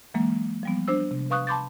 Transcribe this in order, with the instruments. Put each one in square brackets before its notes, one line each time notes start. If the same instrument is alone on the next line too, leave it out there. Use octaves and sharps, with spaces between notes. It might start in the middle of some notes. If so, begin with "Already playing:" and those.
[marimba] E3 F#3 G#3 A#3
F3 G3 B3
D4 C5 E6
C3
B4 F5 C#6 D#6 F#6
A5 B5 C6 D6 G6 A6